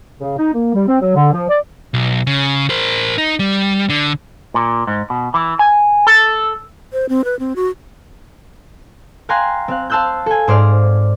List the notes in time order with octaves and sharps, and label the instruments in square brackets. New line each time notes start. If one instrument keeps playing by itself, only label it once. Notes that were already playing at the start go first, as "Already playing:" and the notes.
[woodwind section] C#3
D#4
A#3
G3
C4
F#3
D3
F3
D5
[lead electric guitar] B1
C#3
A#4 C5
D#4
G3
D3
[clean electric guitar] A#2
G#2
B2
E3
G#5
A4
[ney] C5
C4
B4
C4
F#4
[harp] F5 G5 G#5 A#5 C6 F#6
C4 F5 F#6
F5 A5 C6 E6 F#6 G6
A4 G#5
G#2 C5 D5 F6